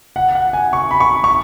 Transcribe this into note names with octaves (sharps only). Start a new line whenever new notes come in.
F#5
F#5
G#5
C#6
B5
C#6
C#6